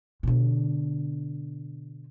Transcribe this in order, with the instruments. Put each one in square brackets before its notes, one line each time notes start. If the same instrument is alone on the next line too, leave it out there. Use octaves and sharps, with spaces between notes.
[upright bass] B2 D3